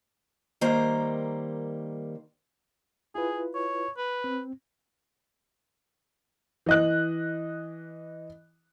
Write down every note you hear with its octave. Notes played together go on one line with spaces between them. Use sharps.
D#3 G3 A#3 C5 A#5
E4 F4 G#4 B4
C#5
B4
C4
E3 D#5 F#6